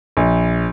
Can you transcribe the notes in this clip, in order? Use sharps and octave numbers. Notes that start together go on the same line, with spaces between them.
A#1